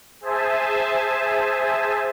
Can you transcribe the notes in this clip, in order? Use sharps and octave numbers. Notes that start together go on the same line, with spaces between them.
G#4 C5 E5 G#5 A5